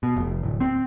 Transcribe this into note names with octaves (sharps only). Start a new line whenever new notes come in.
B2
F1
D1
C4